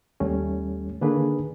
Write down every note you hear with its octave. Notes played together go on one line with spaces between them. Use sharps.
D#2 G3 A3 C#4
D3 D#3 A#3 D4 G#4 B4